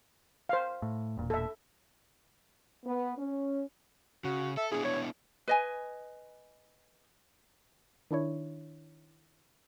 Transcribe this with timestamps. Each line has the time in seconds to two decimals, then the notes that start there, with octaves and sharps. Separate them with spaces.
0.49 C5 F5
0.82 A2
1.17 E1 A#2
1.30 A4 E5
2.85 B3
3.17 C#4
4.24 C#3 F#4
4.57 A4 E5
4.72 B3 D4 E4 G#4
4.84 C#5
5.48 B4 D#5 G#5
8.11 D#3 D4 E4 C#5